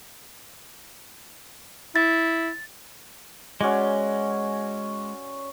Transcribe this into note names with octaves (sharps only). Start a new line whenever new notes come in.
E4 A6
G#3 C#4 F#4 D5